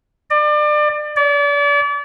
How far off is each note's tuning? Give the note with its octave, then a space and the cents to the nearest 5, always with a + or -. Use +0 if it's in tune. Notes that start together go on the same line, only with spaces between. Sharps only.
D5 +30
D5 -35